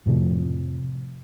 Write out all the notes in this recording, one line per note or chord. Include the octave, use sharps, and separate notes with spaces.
F2 A2 C3 F3